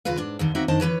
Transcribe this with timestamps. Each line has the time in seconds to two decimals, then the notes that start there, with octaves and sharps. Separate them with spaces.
0.05 D#2 C#3 F4 B4 F5
0.18 G#2 D4
0.39 D#2 D3 D#3
0.55 A#3 C4 D#4 F#4 E5
0.68 F#2 D#3 D4 C5 D#5 A5
0.80 E3 F#3 B4 C#5